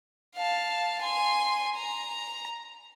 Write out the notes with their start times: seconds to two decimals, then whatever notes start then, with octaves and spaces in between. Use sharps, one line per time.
0.35 F5 A5
1.01 G#5 C6
1.76 A#5